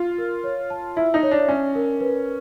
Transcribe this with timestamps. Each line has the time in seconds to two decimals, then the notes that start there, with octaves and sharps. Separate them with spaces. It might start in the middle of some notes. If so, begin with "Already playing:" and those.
Already playing: F4
0.18 A#4
0.44 C#5
0.70 A5
0.96 E4 E5
1.14 D#4
1.23 C#5
1.31 D4
1.48 C#4 C#5
1.75 A#4
2.00 B4